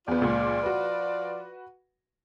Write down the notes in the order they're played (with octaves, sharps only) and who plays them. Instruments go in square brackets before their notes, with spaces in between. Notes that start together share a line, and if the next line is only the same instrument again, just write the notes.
[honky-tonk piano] E2 B3 [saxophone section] F3 F4 D5
[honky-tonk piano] C#2 A#2
F#4 B4